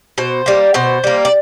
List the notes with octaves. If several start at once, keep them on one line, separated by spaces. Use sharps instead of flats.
B2 C5
G3 A#3
B2 C5
G3 A#3
D5